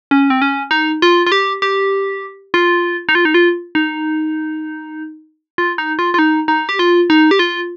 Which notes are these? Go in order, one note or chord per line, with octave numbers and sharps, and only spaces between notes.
C#4
C4
C#4
D#4
F4
F4
G4
G4
F4
D#4
F4
D#4
F4
D#4
F4
D#4
F4
F4
D#4
D#4
G4
F4
D#4
G4
F4